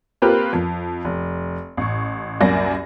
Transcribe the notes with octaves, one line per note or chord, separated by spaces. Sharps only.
A#3 C4 F4 G4 A#4 B4
F2
F1
A1 C#6
C2 F#2 A#3 D5 A#6